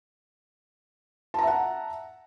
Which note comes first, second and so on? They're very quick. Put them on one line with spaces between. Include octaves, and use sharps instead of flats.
A5 A#5 E5 F#5